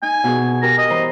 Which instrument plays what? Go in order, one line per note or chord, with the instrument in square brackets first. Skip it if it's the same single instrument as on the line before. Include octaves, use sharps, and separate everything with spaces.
[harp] D#4 [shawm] G#5
[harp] B2 G#4
[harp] G4 A#4 [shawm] A#5
[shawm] D#5
[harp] E3 C5 A#5